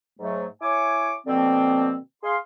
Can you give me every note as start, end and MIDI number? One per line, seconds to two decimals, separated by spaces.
0.19 0.45 44
0.19 0.45 54
0.19 0.45 57
0.61 1.13 64
0.61 1.13 73
0.61 1.13 80
0.61 1.13 86
1.27 1.96 47
1.27 1.96 50
1.27 1.96 53
1.27 1.96 58
1.27 1.96 60
2.23 2.36 68
2.23 2.36 77
2.23 2.36 84